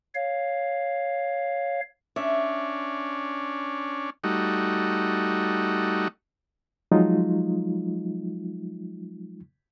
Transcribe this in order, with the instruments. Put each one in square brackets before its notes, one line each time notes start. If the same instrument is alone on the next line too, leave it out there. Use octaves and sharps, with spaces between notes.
[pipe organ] C#5 F5
[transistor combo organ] C#4 D4 [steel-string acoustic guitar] E5
[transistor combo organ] G3 A3 D#4 F#4
[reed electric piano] F3 F#3 G#3 D#4 F4